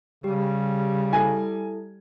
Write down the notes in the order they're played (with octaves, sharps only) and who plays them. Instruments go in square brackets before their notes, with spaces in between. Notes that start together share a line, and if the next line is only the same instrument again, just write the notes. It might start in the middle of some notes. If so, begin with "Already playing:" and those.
[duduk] C#3 [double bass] G3 [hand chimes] G4
[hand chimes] E4 A4 [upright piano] G#5